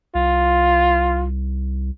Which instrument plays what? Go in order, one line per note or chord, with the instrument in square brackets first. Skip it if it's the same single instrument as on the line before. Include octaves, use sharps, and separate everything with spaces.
[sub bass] C2 [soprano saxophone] F4